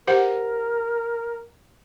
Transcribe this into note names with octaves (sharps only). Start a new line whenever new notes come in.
G4 A#4 C5 F#5